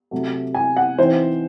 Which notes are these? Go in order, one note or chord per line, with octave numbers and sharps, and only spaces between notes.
C3 F#3 A3
G#5
F#5
E3 C4 D#4 C5